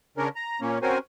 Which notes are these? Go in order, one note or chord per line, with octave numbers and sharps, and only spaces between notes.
C#3 C#4 D4 A#4
A#5
A#2 A#3 C#4
C4 C#4 F#4 A#4 C5 G#5